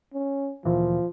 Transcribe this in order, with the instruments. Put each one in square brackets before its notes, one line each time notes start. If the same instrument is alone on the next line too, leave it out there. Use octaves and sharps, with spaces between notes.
[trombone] C#4
[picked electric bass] D2 A#2 E3 [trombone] F3